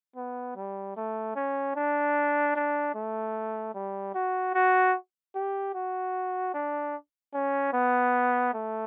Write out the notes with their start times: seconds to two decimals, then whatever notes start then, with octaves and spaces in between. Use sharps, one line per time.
0.16 B3
0.56 G3
0.96 A3
1.36 C#4
1.76 D4
2.55 D4
2.95 A3
3.74 G3
4.14 F#4
4.54 F#4
5.35 G4
5.74 F#4
6.54 D4
7.34 C#4
7.73 B3
8.54 A3